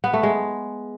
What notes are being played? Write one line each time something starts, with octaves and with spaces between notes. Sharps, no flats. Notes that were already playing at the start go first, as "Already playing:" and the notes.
B3
A3
G#3